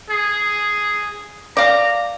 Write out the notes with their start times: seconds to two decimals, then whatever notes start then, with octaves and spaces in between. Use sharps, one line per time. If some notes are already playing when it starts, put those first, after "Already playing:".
0.10 G#4
1.57 D5 F5 A#5